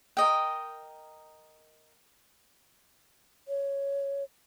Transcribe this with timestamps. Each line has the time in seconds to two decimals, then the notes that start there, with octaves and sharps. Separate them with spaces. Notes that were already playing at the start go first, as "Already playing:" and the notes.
0.17 A#4 D#5 G5
3.48 C#5